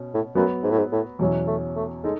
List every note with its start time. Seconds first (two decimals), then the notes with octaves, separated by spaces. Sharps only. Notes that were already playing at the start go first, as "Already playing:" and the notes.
Already playing: B2 C#4
0.14 A2
0.35 F#2 F#3 B3 F#4 B4
0.63 G#2
0.71 A2
0.78 G#2
0.92 A2
1.19 E2 B2 F#3 C#4 E4
1.47 A3
1.76 A3
2.04 G#3 D#4 A4